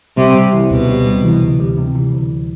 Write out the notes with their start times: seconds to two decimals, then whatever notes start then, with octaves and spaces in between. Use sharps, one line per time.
0.17 C3 G3
0.35 C3
0.53 E3
0.71 D2 B2
0.89 G3
1.06 C3
1.24 E3
1.42 D2
1.60 G3
1.78 C3
1.95 E3
2.14 D2